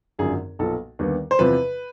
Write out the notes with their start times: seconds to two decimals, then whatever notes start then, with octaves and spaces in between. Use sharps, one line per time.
0.19 G#1 F#2 D3 F3 G#4
0.59 B1 A#2 F3 A4
0.99 D#2 D3 G3 B3
1.31 C5
1.39 E2 C3 F3 B4